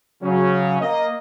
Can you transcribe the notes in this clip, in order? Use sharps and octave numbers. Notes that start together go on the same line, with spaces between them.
C#3 F#3 C#4
A#3 D#5